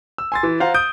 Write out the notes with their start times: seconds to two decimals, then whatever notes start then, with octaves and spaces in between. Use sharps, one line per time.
0.18 E6
0.32 G#5 C6 A6
0.43 E3
0.60 F4 C5 F5 F#5 A#5
0.74 D#6 G6 D7